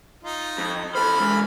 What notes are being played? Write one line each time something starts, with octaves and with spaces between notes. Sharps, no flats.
D#4 F4
F2
E3 A4 C5 B5 F6
C3 G#3